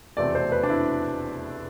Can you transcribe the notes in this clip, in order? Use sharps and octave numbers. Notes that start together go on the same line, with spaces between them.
F1 E2 B2 A3 C4 D5
C5
B4
D4
E4